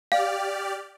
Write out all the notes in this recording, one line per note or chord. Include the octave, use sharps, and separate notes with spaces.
G4 D5 F5 F6